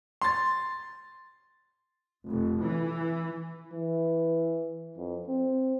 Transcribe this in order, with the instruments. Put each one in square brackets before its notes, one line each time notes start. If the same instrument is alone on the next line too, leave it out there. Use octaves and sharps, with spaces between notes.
[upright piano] C6 A6
[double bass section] F1
E3
[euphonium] E3
F2
C4